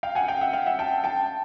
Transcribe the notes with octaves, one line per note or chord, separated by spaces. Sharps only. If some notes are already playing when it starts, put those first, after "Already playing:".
F5 G5
F#5 G#5
F5 G5
E5 F#5
F5 G5
E5 F#5
G5 A5
G5 A5